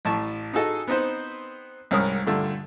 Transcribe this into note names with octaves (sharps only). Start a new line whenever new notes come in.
A1 A2 A5 C#6
D#4 F#4 G#4 A4 D#5 G#5
B3 C4 D#4 B4 C5
C2 G#2 C#4 A#4 D#6 F6
G2 A#2 D3 A3